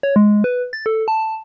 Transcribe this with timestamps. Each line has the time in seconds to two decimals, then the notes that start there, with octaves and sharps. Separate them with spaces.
0.03 C#5
0.16 G#3
0.44 B4
0.73 A6
0.86 A4
1.08 A5